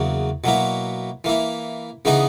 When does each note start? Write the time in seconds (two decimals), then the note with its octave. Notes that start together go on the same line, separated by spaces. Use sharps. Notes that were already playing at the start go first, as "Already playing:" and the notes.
Already playing: E2 C#3 F#3 A#3
0.44 B2 F#3 A#3 E4
1.24 E3 A#3 E4
2.05 C#3 E3 B3 D#4 G#4